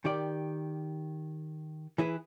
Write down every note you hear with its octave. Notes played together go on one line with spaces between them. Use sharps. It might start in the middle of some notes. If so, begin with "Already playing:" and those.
D#3 G4 D5
E3 E4 G#4 B4